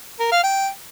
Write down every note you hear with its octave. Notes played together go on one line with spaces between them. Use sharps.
A#4
F5
G5